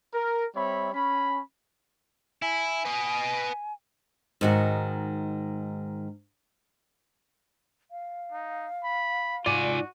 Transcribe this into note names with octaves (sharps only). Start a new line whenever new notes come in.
A#4
G3 C4 C#5 E5 B5
C#4 B5
E4 G#5
B4 D#5
G#2 D#3 F#4
F5
D#4
B5
G#2 F4 F#4 D5 G#5